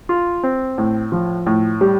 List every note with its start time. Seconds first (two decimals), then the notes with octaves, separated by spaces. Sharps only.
0.09 F4
0.43 C4
0.78 A2
1.12 F3
1.46 A2
1.81 G3